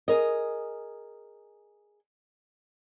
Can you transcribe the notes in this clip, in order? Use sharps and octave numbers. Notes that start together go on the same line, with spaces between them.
G#4 A#4 D#5